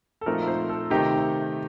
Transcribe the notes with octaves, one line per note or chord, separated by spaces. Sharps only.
A4
A#2 F3 A3 C4 D#4 A#4
C5
A4
C3 D#3 A3 D#4 G4